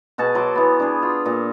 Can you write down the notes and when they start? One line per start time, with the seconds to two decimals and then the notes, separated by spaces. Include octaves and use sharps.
0.18 B2 F#4 G#4 A5
0.35 F#3 C6 D6
0.55 E3 B3
0.80 D4 G#4
1.03 F4
1.26 A#2